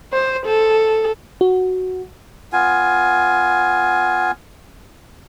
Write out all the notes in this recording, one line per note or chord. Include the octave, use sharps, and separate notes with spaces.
C5
A4
F#4
B3 F4 G#5